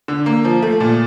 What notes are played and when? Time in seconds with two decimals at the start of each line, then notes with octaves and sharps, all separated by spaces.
0.08 D3
0.26 A#3
0.45 F3
0.62 A3
0.80 A#2